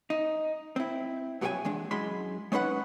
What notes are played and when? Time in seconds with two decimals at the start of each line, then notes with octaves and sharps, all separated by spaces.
0.10 D#4
0.76 C4 E4
1.41 G2 F#3 G4 A4 G5 G#5
1.65 E2 G#3 D4
1.91 F#2 G#3 E4 B5 C6
2.52 G#3 C#4 D#4 B4 F#5